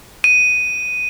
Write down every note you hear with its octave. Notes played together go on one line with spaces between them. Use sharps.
D#7